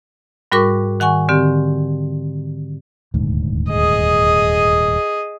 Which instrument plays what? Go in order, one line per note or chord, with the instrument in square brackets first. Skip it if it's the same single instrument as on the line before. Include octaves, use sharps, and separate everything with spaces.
[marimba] G#2 G3 F#4 A#4 C#6 D6
D#3 F#5 G#5 C#6
D3 C4 G4
[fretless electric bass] D#1 D2 G#2
[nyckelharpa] G#4 D#5